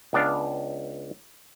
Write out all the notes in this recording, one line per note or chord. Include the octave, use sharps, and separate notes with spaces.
C#2 B3 D4 D5 F5